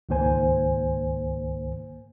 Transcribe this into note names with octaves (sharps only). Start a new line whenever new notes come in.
C#2 G#2 D#3 A#3 C5 G#5